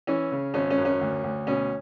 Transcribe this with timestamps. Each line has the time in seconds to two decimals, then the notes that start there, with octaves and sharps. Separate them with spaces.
0.07 E3 C#4
0.32 C#3
0.54 G#1 C#4
0.70 C#4
0.78 F#2
0.85 C#4
1.01 D2
1.24 D2
1.47 B2 C#4